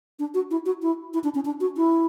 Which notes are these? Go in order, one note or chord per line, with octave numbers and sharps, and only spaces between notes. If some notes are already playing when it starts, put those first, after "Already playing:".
D4
F#4
E4
F#4
E4
E4
D4
C#4
D4
F#4
E4